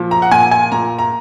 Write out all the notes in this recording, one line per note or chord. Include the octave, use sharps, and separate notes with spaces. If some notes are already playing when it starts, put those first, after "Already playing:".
Already playing: A#2 F3
A#5
F#5
A#2 G#5
G#5
A#2 A#5
A#5